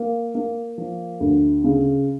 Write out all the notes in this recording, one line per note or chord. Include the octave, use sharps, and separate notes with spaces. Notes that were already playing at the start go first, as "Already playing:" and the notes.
Already playing: A#3
A#3
F3
D2
C#3